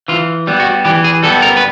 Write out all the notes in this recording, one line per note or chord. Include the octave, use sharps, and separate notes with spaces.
E3 F4
G3 B3
F#4
E3 G4
G#4
G3 B3 A4
A#4
B4